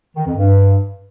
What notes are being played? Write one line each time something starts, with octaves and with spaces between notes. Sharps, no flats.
D#3
F2
G2